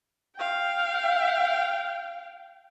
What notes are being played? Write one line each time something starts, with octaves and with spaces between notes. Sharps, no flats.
F5 G5